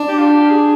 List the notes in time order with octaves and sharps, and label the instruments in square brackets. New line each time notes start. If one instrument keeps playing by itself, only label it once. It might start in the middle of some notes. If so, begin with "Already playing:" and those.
Already playing: [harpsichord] D4
[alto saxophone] G4
F4
G4
G#4